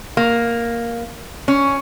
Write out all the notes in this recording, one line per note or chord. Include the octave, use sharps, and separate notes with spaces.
A#3
C#4